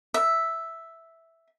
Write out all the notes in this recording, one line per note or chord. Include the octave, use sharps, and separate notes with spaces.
E5